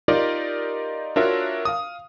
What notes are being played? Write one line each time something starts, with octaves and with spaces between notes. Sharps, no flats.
D#4 F4 G4 A#4 D5 D#5
D4 F4 F#4 A#4 C#5 E5
F5 D#6